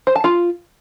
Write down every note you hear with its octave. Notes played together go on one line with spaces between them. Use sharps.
C5
A5
F4